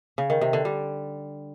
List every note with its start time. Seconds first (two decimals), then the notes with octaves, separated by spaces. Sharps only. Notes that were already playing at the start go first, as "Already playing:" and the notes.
0.18 C#3
0.30 D#3
0.41 C3
0.53 D3
0.65 G3